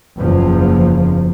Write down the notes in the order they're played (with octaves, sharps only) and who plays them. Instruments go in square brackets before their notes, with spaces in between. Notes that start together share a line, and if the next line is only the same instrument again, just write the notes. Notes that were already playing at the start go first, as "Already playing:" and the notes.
[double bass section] F#1 E2 F3